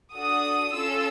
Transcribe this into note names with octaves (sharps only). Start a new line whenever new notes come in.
D4 F#4 A4 D#6
C#4 F4 A4 E6